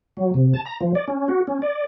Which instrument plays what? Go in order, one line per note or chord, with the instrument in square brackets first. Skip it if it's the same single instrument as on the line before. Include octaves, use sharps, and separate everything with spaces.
[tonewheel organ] F#3
C3
A5
A#5
F3
D5
C#4
F#4
C#4
D5